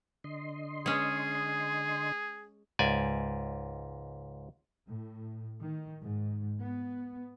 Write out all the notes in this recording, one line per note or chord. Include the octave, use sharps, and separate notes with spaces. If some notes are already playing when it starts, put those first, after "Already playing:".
D3 D#5 C6
G#3 C#4 G#4
C#2 G#2 D5 G#5
A2
D#3
G#2
B3